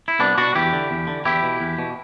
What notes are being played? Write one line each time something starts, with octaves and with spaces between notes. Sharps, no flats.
E4
C2 B3 D4
B2 D4 F#4
E2 E4 G4
D3
E2
D3
E2 E4 G4
B2
E2
B2